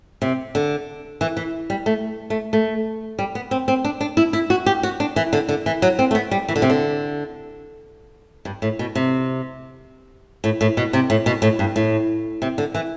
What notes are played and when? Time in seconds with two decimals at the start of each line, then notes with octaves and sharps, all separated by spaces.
0.22 C3
0.55 D3
1.21 E3
1.37 E3
1.70 G3
1.86 A3
2.30 A3
2.53 A3
3.19 G3
3.35 B3
3.51 C4
3.68 C4
3.84 D4
4.01 D4
4.17 E4
4.33 E4
4.50 F#4
4.66 G4
4.83 F#4
5.00 D4
5.16 E3
5.33 D3
5.49 D3
5.66 E3
5.82 F#3
5.99 C4
6.11 A3
6.15 B3
6.31 G3
6.48 E3
6.56 D3
6.62 C3
6.70 D3
8.45 G2
8.62 A2
8.79 B2
8.95 C3
10.44 A2
10.61 A2
10.77 B2
10.93 C3
11.10 A2
11.26 B2
11.42 A2
11.59 G2
11.76 A2
12.42 C3
12.58 D3
12.75 E3